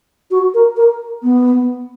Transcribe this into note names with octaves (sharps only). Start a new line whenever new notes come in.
F#4
A#4
A#4
B3